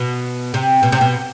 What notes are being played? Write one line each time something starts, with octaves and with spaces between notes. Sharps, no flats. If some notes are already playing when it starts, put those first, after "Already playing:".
Already playing: B2
C3
B2
C3
B2